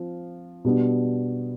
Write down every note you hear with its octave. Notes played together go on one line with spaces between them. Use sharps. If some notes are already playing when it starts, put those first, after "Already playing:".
Already playing: F3 C4
B2 G3 B3 D4